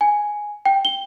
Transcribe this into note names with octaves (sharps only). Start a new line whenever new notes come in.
G#5
G5
G7